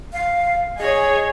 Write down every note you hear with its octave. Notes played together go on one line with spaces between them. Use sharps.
F5
G#4 C#5 D#5